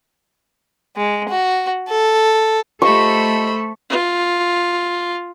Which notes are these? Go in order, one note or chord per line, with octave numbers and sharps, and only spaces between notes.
G#3
F#4
A4
A3 F4 G4 A4 C5 D#5 B5 C#6
F4